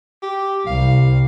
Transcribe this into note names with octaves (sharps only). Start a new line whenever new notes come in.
G4
C2 F5